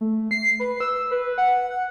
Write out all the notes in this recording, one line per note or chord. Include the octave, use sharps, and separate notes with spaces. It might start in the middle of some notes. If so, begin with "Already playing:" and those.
A3
C7
B4
E6
B4
F#5
F#5